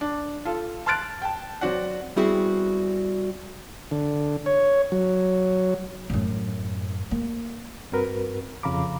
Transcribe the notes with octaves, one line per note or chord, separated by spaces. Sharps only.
D4
F4 A4
A5 C6 F6 F#6 A6 D7
G5 A5
F#3 C4 F#4 D5 F#5
G3 B3 C4 E4 F#4 G#4
D3
C#5
F#3
F#2 A2
A#3
G2 C4 F#4 A#4 B4
F2 C#3 F5 A#5 B5 D6